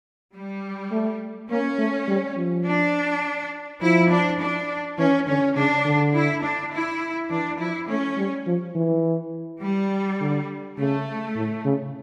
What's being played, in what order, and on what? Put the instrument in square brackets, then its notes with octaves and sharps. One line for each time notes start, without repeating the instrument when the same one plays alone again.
[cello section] G3
[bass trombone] A3
[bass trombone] A#3 [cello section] C#4
[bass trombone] A3
G3
F3
[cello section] D4
[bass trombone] F3 [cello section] E4
[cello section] D4
D4
[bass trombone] E3 [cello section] C#4
[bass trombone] D3 [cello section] C#4
[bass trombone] C#3 [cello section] D4
[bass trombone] D3
[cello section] E4
D4
E4
[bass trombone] E3 [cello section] D4
[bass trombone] F3 [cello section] E4
[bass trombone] A3 [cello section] C#4
[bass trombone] G3
F3
E3
[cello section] G3
[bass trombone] D3
[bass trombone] C#3 [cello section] A3
[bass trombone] A2
C#3